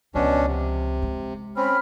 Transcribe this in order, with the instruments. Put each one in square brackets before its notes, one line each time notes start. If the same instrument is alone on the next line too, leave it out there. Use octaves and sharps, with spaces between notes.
[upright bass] C#2 F3 [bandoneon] B2 C#4 D4
[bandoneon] C3
[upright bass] G#3
[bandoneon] C4 C#4 [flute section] C5 B5 F6